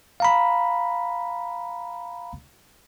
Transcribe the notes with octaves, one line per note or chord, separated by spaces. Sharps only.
F5 A#5 B5